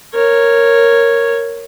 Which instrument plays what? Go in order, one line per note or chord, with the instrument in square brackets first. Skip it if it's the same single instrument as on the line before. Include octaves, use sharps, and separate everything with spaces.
[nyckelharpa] A#4 C#5